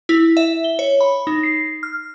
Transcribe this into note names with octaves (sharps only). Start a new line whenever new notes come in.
E4
E5
G7
C#5
B5
D#4
C7
F6